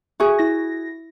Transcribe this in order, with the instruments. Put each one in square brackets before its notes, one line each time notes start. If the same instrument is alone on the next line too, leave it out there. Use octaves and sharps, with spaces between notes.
[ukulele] F#4 G#4 [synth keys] E5 C#6
[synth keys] E4 A#6